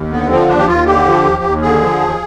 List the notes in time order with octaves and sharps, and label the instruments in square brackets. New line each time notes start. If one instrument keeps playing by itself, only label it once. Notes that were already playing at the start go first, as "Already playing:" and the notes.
Already playing: [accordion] D#2
D3 B3
F3 C4
D#2 D4
G4
D#2 F4
D3 G4
F3
D#2
D#2
D3 G#4
F3
D#2